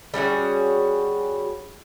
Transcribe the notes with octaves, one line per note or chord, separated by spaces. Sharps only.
G3 C#4 F#4 G#4